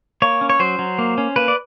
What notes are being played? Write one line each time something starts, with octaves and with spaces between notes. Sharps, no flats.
A#3 C#5
C#4
C#5
F#3 C5
F#3
A#3
C#4
A#3 B4
D5